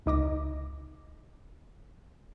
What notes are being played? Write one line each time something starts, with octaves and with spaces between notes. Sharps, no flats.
C#2 D#4 D6 A#6